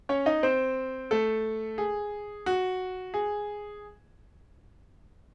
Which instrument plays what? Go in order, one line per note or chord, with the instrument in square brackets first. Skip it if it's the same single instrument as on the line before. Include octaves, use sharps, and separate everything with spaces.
[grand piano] C#4 C#5
D#4 D#5
C4 C5
A3 A4
G#4
F#4
G#4